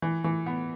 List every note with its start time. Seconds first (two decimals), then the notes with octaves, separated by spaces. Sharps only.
0.02 E3
0.24 E3
0.46 B3